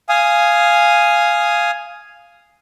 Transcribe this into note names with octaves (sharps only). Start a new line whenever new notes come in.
F5 G#5 D#6